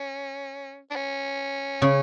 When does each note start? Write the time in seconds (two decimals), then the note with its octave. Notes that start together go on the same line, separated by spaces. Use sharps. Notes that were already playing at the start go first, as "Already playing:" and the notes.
Already playing: C#4
0.90 D4
0.96 C#4
1.82 C#3